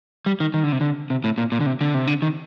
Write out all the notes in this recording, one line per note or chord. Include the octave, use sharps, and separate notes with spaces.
G3
D#3
D#3
D3
C3
D3
C3
A2
A#2
A#2
D3
C3
D3
C3
D3
D#3